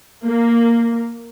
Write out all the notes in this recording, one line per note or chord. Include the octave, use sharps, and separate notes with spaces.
A#3